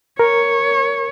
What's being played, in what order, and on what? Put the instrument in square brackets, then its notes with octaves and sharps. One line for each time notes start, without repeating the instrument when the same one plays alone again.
[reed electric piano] A#4 [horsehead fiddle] C#5